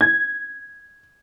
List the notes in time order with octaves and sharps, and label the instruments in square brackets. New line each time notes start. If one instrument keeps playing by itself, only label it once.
[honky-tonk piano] G#6